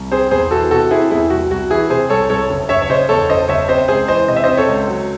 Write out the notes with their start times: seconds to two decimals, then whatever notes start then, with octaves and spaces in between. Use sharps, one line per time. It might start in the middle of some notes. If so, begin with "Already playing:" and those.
Already playing: C2
0.12 C4 G#4 C5
0.31 E2 G#4 C5
0.51 E3 F#4 A4
0.71 C3 F#4 A4
0.90 C4 E4 G#4
1.11 E2 E4 G#4
1.30 C2 F#4
1.51 C2 F#4
1.70 E3 E4 G#4
1.90 C3 G#4 C5
2.10 C2 A4 C#5
2.30 C2 A4 C#5
2.50 F#1
2.69 F#1 C#5 E5
2.82 C#5
2.89 C#3 C5 D#5
3.09 E2 A4 C#5
3.29 F#1 C5 D#5
3.48 F#1 C#5 E5
3.69 C4 C5 D#5
3.88 C#2 G#4 C5
4.08 E3 C5 D#5
4.28 C3 D#5
4.36 E5
4.44 C4 C5 D#5
4.57 A4 C#5
4.68 C#2
4.88 F#3